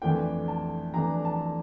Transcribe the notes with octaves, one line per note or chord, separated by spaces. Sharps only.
F2 E3 A3 D4 G5
A5
F2 E3 A3 D4 A#5
A5